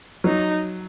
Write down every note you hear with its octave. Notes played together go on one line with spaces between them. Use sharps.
F#3 D#4